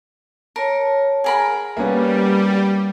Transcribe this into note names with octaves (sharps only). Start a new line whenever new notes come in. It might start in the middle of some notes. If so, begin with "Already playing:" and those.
A#4 C#5 A5
G#4 A#4 F#5 B5
G3 A#3 B3 C#4